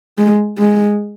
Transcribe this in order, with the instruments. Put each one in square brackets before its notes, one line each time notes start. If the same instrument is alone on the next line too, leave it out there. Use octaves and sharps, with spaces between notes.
[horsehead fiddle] G#3
G#3